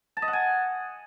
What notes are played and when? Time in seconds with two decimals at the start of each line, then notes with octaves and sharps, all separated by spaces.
0.17 A5
0.22 D#5
0.28 F#5
0.33 G#5